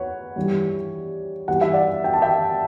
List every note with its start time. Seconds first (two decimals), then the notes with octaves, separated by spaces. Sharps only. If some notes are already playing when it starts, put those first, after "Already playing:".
Already playing: E2 B4 C#5 F#5
0.36 G2 E3 G3
1.48 G2 E3 G3 F#5
1.61 E5
1.74 D5 F#5
2.04 G5
2.13 A5
2.22 E5 G5